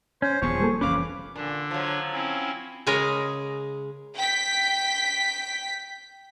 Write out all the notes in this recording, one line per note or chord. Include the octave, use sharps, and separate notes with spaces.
C#4 C5
D#1 E2 F3 B3 G#4 C#6
G3 A#3 A4
F1 E3 C#4 B4 C#5 F5 D6
A#2 D3 D4
F3 F#3
C4 C#4 E4
C#3 G#3 G#4 A#4 C#5
G5 B6